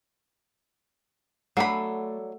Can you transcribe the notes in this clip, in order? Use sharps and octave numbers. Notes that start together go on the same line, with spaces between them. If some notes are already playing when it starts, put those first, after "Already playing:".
F#3 A3 D4 F#5 B5